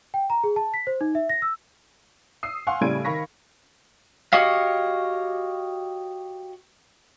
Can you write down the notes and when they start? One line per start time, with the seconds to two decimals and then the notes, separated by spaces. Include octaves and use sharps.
0.14 G5
0.30 A#5
0.44 G#4
0.56 A5
0.74 B6
0.87 C5
1.01 D#4
1.15 E5
1.29 A#6
1.42 E6
2.43 D#6 E6 C7
2.67 F5 F#5 G#5 C6 C#6
2.81 A2 C#3 G3 G#6 D7 D#7
3.05 D#3 F5 B5 C#6 A#6 B6
4.33 F#4 G4 C#5 D#5 F5